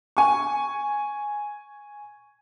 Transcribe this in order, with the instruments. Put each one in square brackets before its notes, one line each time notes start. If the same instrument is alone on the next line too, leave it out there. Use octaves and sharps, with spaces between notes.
[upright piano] G#5 C#6